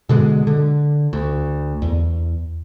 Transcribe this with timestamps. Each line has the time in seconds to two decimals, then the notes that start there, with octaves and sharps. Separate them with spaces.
0.09 B2 D3 F3 G#3
0.47 D3
1.13 D2
1.82 E2